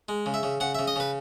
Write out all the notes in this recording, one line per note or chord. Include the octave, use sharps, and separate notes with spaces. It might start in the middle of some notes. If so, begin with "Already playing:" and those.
G#3
C#3
E5
C#3
C#3 F#5
E5
C#3
D#5
C#3 B4